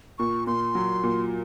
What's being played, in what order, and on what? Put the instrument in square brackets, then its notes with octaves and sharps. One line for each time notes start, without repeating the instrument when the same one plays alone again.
[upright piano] A#2 [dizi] C#6
[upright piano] A#2 [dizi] C6
[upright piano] F#3
A#2